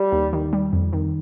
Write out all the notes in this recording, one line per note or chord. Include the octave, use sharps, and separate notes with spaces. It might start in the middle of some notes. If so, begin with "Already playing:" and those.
Already playing: G3
D#2
D#3
G3
F2
D#3